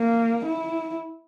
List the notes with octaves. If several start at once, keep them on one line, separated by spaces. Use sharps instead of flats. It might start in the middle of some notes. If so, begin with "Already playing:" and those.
Already playing: A#3
E4